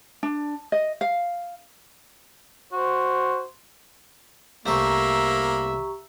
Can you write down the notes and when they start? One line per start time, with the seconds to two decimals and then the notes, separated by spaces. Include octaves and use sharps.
0.23 D4
0.72 D#5
1.01 F5
2.73 F#4 C5
4.66 C2 A3 A#3 C4 G4 E5 A#5 C#6